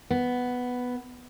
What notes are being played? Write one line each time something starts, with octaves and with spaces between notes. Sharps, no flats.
B3